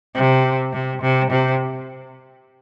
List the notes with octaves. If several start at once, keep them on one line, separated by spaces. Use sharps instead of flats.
C3
C3
C3
C3